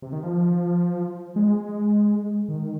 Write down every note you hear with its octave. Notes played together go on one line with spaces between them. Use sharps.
C3
D#3
F3
G#3
D#3